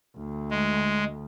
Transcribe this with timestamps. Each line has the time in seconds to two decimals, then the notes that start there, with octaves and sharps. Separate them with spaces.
0.17 D2
0.50 G#3